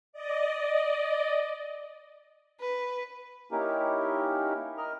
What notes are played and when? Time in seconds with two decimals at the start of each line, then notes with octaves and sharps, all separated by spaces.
0.13 D5 D#5
2.60 B4
3.52 A#3 C#4 D#4 E4 G4 A#4
4.77 A#4 D#5 F6